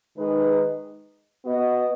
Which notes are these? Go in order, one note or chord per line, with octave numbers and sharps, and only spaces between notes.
D#3 G#3 D#4 G#4 B4
B3 F#4 D#5